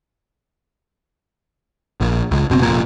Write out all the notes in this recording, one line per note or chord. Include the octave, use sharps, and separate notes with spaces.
A#1
C#2
F#1 B2 C4
F1 A#2